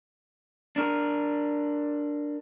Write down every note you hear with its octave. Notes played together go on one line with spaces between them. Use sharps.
D4 A#4